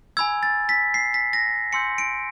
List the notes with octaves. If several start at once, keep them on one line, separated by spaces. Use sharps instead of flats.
G#5 B5 E6 G#6
A6
B6
C7
B6
A#6
G#5 C6 E6 G6 C#7
D7